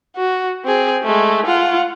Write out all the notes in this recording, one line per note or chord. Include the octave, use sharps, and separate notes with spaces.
F#4
C4 G#4
G#3 A3
F4 F#5